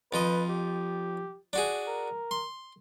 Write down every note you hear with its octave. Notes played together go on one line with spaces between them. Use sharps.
F2 F3 B4 D#5
G4
D4 F#4 G#4
A#4
C6